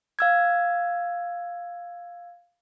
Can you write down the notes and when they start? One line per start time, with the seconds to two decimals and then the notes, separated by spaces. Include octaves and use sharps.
0.19 F5 E6 G#6